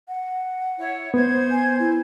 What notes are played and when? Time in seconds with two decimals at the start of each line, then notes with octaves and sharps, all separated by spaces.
0.08 F#5
0.78 E4 C#5
1.14 B3 C5 G#6
1.51 G#5
1.79 E4